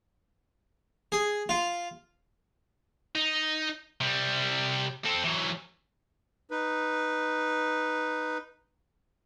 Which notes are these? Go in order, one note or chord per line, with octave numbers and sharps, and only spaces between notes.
G#4
F4
D#4
C3 G3
C4 A4
E3 F#3
D#4 B4